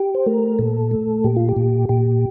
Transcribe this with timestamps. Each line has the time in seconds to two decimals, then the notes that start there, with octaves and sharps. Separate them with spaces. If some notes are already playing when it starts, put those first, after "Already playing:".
Already playing: G4
0.15 C5
0.26 A3 A#4
0.59 A#2 A4
0.91 A3
1.24 A#2 G4
1.36 F4
1.49 G4
1.56 A#2
1.89 A#2 G4